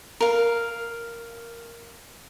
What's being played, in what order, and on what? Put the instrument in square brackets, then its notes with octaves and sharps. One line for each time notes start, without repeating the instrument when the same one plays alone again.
[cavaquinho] A#4 F5